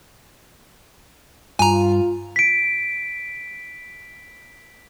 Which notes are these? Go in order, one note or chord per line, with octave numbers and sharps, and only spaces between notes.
G2 F4 G#5 A#5
B6 D7